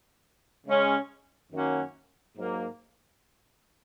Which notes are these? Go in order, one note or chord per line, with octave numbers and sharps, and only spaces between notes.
C#3 G#3 C#4
F#2 D#3 A#3 C#4 F#4
G#2 F#3 A#3